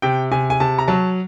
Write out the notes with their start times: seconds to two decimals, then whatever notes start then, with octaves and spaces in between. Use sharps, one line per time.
0.02 C3 G5
0.32 C3 G#5
0.50 G#5
0.60 C3 A5
0.79 A#5
0.88 F#3 A5